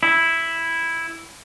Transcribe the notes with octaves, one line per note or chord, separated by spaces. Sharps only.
E4